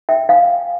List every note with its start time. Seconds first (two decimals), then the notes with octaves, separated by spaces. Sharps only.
0.09 E5 G5
0.29 F5 G#5